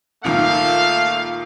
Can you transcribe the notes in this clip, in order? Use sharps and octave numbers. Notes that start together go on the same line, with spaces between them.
C#2 A#2 D#3 A3 F5